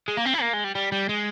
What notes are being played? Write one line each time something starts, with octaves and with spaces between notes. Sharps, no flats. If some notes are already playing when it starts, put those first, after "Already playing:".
G#3
A#3
C4
E4
A#3
G#3
G3
G3
G3
G#3